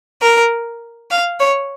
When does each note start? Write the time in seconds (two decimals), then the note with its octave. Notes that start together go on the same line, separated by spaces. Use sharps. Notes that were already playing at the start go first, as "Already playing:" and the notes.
0.22 A#4
1.11 F5
1.40 C#5